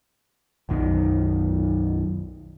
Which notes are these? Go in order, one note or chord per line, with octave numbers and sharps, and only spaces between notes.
B1 F#2 D#3